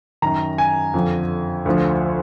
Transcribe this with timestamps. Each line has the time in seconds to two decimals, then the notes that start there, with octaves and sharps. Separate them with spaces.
0.22 F#2 D#3 A#5
0.58 G#5
0.94 F2 D3 F3
1.66 D2 D3 F3